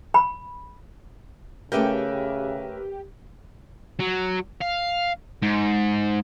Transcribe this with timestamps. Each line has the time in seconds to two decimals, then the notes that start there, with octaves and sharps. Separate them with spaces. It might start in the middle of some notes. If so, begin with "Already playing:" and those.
0.14 B5
1.72 C#3 A3 C#4 G4 A#4 B4 E5 G5
4.00 F#3
4.62 F5
5.43 G#2